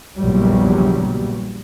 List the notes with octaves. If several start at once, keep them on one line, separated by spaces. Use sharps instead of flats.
A#1 E2 A#2 C#3 F#3 G3